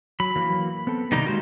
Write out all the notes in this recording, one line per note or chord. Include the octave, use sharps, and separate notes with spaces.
F#3 B5
E3 F#3 A#3
B3 C4 A4
C3 D#3 G3 A#3 D#4
G#3 A#3 F#4 C5